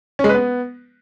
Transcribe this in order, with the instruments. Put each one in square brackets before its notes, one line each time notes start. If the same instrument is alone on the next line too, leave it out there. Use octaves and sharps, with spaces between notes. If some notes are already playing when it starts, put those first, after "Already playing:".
[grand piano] C#4
G#3
B4
B3